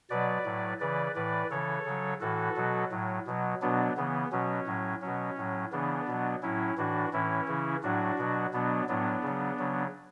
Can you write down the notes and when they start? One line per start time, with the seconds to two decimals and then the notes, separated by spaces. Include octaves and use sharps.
0.10 B2 F#3 B4 D5
0.45 A2 F#3
0.80 C#3 E3 B4 D5
1.15 A2 E3 B4 D5
1.50 C#3 E3 A4 C#5
1.86 C#3 F#3
2.21 A2 E3 F#4 A4
2.56 B2 F#3
2.91 A2 F#3
3.26 B2 F#3
3.62 B2 F#3 B3 D4
3.97 C#3 E3 B3
4.32 B2 F#3 C#4
4.66 A2 F#3
5.02 B2 F#3 C#4
5.38 A2 F#3
5.72 C#3 E3 B3 D4
6.07 B2 F#3
6.42 A2 F#3 C#4 E4
6.78 A2 E3 D4 F#4
7.13 A2 E3 C#4 E4
7.48 C#3 E3
7.83 A2 F#3 D4 F#4
8.18 B2 F#3
8.53 B2 F#3 B3 D4
8.88 A2 F#3 B3 D4
9.23 C#3 F#3
9.59 C#3 F#3